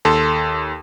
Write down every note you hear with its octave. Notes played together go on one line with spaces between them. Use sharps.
D#2 A4 C6